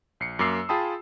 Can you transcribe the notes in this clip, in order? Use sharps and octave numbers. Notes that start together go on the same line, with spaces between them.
A#1 C7 C#7
F#2 A#3 D6 E6 C7
F4 G#4 G5 A5 B5 D#6